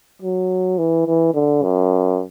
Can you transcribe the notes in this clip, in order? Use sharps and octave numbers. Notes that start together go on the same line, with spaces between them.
F#3
E3
E3
D3
F#2